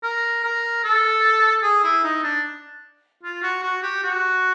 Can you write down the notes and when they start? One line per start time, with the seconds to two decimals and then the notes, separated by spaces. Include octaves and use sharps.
0.03 A#4
0.44 A#4
0.84 A4
1.63 G#4
1.84 E4
2.04 D#4
2.24 D4
3.23 F4
3.43 F#4
3.63 F#4
3.83 G4
4.03 F#4